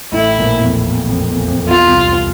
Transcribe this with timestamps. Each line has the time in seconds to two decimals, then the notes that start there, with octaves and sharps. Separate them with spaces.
0.12 A1 A2 E4
0.38 A#1 A#2
0.59 E2
0.64 F2
0.90 E2
1.09 F2
1.29 E2
1.48 F2
1.67 E2 F4
1.87 C2 C3